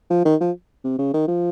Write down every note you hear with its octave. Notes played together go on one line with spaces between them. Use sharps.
F3
D#3
F3
C3
C#3
D#3
F3